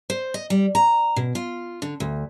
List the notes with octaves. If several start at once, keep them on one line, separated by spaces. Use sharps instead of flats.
C5
D#5
G3
A#5
B2
F4
D3
D2